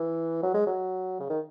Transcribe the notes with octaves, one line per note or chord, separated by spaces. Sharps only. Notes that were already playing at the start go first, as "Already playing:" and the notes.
Already playing: E3
F#3
G#3
F#3
C#3
D#3